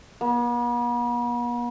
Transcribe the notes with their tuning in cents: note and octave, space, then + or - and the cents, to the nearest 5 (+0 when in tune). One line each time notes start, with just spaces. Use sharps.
B3 -45